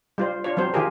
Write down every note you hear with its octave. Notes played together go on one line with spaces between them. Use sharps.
G3 F4 C5
D4 F4 C#5
F3 F#3 C4 C5
D#3 F4 G4 G#4 A#4